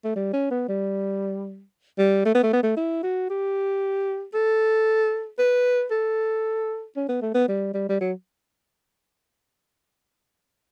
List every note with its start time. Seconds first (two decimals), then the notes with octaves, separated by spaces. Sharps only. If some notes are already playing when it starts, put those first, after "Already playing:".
0.04 A3
0.16 G3
0.33 C#4
0.51 B3
0.69 G3
1.99 G3
2.25 A3
2.35 B3
2.43 A3
2.53 B3
2.63 A3
2.77 E4
3.03 F#4
3.30 G4
4.34 A4
5.39 B4
5.91 A4
6.96 C#4
7.09 B3
7.22 A3
7.34 B3
7.48 G3
7.74 G3
7.89 G3
8.01 F#3